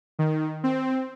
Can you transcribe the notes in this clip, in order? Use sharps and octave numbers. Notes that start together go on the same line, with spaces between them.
D#3
C4